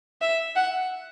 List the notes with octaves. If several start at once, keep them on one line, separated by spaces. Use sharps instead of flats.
E5
F#5